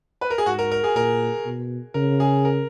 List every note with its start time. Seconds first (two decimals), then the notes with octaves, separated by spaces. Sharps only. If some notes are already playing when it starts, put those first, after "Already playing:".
0.21 B4
0.30 A#4
0.38 G#4
0.46 G#2 F#4
0.59 A#4
0.71 A#4
0.84 G#4
0.96 A#2 A#4
1.45 B2
1.94 C#3 A#4
2.20 G#4
2.45 A#4